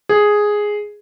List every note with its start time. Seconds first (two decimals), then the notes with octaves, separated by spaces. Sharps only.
0.09 G#4